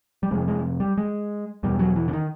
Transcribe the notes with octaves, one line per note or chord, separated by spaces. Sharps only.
G3
F2 C3 G#3
G#3
G3
G#3
E2 B2 G3
F#3
E3
D3
D#3